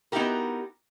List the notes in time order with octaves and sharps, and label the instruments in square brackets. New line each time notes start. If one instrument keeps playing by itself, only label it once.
[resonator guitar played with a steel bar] B3 D#4 E4 F#4 G4 A#4